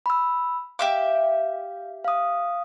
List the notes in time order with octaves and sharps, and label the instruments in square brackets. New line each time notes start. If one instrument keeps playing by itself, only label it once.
[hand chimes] B5 E6
[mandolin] G4 E5 D6 [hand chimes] F5
[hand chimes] F5 D#6